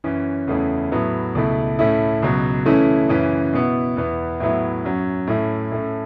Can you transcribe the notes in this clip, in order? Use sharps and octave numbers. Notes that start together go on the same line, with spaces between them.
F#2 E3 C#4
E2 C#3 A3 C#4 E4
A2 F#3 B3 E4
C#2 B2 A3 E4
A2 A3 C#4 E4
C#2 B2 F#3
C#3 E3 A3 C#4 E4
F#2 C#3 E3 C#4
B2 B3 E4
E2 E3 B3 E4
A2 F#3 B3 E4
F#2 F#3 C#4
A2 A3 C#4 E4
A2 A3 C#4